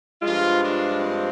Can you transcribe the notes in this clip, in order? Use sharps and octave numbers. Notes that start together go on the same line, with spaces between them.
G2 F3 G#3 F4
D4
C4